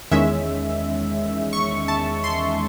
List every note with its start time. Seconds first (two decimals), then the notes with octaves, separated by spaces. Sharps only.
0.11 E2 D#3 G#3 C#4 E5
1.53 C#6
1.88 A5
2.24 C6